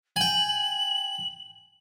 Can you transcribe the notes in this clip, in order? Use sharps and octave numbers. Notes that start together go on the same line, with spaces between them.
G5 G#5 F#7